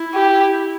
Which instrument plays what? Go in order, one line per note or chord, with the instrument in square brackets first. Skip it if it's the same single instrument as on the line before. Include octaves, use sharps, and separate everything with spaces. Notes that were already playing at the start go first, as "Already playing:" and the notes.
Already playing: [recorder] E4
[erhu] G4